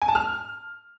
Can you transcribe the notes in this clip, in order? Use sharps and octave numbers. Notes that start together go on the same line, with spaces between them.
G#5
A5
F6